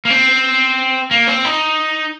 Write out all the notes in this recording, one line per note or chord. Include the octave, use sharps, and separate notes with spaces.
A#3
C4
A#3
C4
D#4